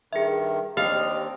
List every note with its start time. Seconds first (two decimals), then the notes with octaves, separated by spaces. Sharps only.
0.13 G2 D#3 G#4 E5
0.77 D#2 C4 D4 G4 D#5 F5